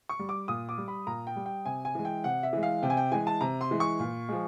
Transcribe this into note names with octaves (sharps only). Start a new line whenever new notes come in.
C#6
G3
D6
A#2 D#6
D6
G3
B5
A#2 A#5
G5
G3
G5
C3 G#5
G#5
E3 G#3
G5
C3 F#5
E5
E3 G#3
F5
C3 G5
G#5
G5
E3 G#3 G#5
A5
C3 A#5
C6
E3 G#3
C#6
A#2
F3 G#3